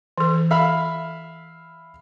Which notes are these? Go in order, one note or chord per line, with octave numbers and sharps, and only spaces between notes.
E3 A4
A4 E5 F5 B5